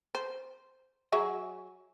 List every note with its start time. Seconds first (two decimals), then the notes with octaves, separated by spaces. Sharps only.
0.15 C5
1.12 F#3 G#4 E5